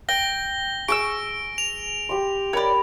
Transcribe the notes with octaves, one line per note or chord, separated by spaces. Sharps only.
G5 A#6 G7
G#4 C#6 D6 E6 D7
F7
G4 C6
A#4 C#5 D5 B5